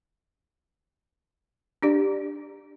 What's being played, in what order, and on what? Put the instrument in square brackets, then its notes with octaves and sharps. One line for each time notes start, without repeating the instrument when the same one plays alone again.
[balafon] D4 G4 D5